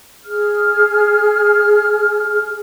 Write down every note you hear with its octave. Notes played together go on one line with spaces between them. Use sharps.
G#4 F6